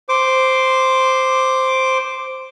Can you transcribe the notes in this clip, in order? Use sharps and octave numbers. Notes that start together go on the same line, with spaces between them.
C5 D6